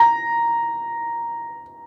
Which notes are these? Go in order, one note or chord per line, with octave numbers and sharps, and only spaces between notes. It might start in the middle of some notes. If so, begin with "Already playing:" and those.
Already playing: A#5